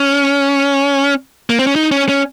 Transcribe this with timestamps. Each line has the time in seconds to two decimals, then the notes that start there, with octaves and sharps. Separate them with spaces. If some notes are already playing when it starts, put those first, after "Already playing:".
Already playing: C#4
1.50 A#3
1.59 C4
1.66 C#4
1.75 D#4
1.91 C#4
2.09 C#4